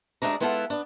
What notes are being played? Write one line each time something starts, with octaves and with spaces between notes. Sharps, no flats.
D2 G#3 A3 D4 A#5
G#3 B3 E4 F4 A4 F#5
B3 D4